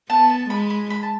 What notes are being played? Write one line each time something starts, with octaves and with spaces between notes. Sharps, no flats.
B3 A5
A5
G#3 B5
B5
B5
A5